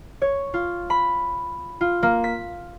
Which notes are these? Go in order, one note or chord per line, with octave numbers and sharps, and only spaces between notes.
C#5
F4
B5
F4
A#3
B6